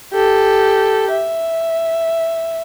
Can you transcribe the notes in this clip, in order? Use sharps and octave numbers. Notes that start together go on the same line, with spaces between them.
G4 A4
E5